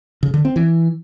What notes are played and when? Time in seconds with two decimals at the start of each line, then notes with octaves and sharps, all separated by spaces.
0.23 C#3
0.34 D3
0.45 C4
0.56 E3